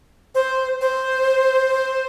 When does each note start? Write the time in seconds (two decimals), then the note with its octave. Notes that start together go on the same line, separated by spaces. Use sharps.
0.35 C5
0.81 C5